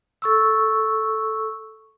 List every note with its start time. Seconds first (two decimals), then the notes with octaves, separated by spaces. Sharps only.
0.22 A4 C#6 E6